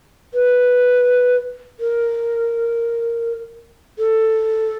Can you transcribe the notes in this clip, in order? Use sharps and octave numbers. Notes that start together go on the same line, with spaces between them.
B4
A#4
A4